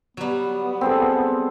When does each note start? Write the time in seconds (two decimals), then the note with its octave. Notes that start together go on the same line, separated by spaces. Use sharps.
0.17 F#3 G3 B3
0.81 C4 G#4 A4